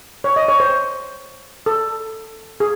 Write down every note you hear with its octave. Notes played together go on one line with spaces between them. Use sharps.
C#5
D#5
C#5
C5
A4
G#4